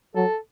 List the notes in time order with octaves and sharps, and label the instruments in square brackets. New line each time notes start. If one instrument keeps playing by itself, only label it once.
[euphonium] F#3 [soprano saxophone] A4